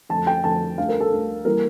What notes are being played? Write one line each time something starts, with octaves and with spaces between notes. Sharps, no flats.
F2 D3 A3 A5
G5
F2 D3 A3 A5
D2 D3 A3 F5
A#4
A4
D2 D3 A3
E3 G3 A#3 A#4